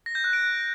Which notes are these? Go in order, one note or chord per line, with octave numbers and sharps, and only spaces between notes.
A#6
G6
F#6
D7